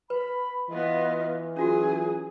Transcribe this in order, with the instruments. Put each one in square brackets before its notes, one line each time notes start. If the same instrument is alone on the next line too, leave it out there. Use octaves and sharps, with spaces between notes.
[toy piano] B4 [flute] B5
[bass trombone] E3 [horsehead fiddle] B3 F4 [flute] D#5
[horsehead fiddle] F#3 G#4 [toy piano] C#4 F4 F#4 [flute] G#5